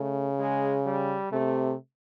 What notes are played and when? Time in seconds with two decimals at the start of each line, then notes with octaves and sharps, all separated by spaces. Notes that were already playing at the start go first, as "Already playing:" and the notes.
Already playing: C#3 A3
0.39 G#3
0.86 G3
1.32 C3 A3